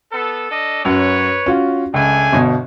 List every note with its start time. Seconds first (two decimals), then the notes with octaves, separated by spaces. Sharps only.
0.12 B3 A4
0.51 D4 A4 D#5
0.85 F#2 F#4 B4 C#5
1.46 C#4 F4 F#4
1.94 C#2 A3 D4 G#5
2.33 G1 B2